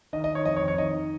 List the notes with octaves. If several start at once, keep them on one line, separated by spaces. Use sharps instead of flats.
D#3 D#5
D#5
D#3
C#5
F2 D#5
C#5
F2
C#5
D#3 D#5
D#3